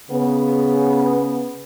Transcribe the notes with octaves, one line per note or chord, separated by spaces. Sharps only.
C#3 B3